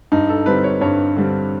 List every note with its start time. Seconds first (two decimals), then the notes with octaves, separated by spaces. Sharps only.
0.12 G2 D#4
0.29 A4
0.46 D3 G3 C4 B4
0.64 C#5
0.81 G2 C#5
1.17 D3 G3 C4